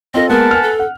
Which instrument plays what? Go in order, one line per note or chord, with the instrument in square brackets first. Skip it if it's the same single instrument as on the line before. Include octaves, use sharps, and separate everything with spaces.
[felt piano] C4 F4 A4 [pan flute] D#5
[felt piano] G#3 A#3 B3 [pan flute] A#4 [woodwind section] B4 F#5 A5
[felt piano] G#5 F6
[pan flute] A4
[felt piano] F#5